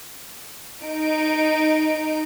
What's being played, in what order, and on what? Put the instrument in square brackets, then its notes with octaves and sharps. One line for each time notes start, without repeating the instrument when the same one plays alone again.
[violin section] D#4 D7